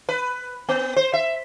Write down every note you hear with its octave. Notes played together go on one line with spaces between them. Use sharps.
B4
B3
C5
E5